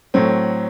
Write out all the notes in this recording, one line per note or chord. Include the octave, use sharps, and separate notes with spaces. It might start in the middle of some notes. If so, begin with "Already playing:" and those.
A2 F#3 C4